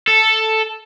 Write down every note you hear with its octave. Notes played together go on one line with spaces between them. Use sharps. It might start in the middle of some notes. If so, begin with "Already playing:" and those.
A4